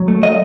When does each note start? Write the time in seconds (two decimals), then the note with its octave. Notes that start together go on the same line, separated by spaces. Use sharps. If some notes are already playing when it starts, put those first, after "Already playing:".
Already playing: F#3
0.08 A3
0.23 D#5